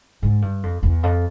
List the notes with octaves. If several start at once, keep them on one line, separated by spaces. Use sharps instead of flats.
G#2
G2
F2
E2
F2